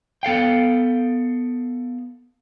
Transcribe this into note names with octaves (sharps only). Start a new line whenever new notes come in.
B3 A4 F5 G5